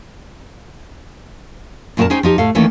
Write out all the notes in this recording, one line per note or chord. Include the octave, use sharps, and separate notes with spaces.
F#2 A#2 A3 F#4 A#4 A5
C#4 D#4 G#4 C5 G5
F3 D#4 G4
A2 A4 F5
D#3 E3 A3 A#3 C#4 A4